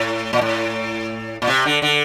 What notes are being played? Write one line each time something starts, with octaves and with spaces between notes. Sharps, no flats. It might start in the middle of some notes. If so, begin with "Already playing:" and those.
Already playing: A2
A#2
A2
A#2
C3
D3
D3